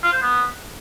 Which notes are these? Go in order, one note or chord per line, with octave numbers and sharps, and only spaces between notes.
F4
C5
B3